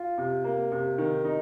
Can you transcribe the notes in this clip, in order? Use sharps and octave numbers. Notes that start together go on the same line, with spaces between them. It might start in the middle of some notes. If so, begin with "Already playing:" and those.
Already playing: F4
C3
A#3
C3
D#3
D#4